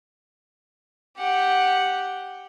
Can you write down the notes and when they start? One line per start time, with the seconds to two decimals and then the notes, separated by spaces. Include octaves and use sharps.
1.18 G4 F#5